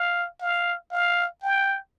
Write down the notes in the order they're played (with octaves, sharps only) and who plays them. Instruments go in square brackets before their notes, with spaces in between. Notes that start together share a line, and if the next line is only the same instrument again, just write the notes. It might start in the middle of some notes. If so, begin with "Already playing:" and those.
Already playing: [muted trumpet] F5
F5
F5
G5